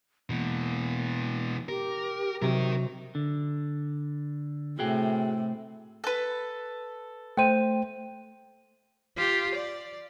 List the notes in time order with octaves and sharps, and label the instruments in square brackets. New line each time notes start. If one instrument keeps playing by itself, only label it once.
[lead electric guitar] B2 E3 [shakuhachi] A#3
[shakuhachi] G4 [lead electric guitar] A#4
[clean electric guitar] C3 F#3 C4 [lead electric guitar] D#4 A#4
[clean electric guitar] D3
[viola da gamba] A2 C3 [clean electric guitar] F#4 G#4 G5
[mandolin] A4 B4
[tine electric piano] A3 C5 [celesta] G5 D#7
[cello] F4 G4
D5